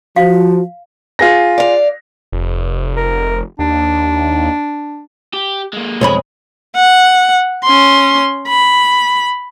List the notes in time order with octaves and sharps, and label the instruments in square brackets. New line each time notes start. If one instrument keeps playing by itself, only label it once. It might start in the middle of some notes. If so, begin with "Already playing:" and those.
[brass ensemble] F3 [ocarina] F#4 [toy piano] F5
[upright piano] F4 G#4 A#6
[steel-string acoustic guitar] D5 F5
[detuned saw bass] F1
[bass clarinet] A#4
[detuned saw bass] D#2 [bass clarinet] D4
[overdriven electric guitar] G4
G#3 A#3
[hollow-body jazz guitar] B1 F2 B5 [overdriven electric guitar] G#3 G#4
[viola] F#5
C#4 C6
B5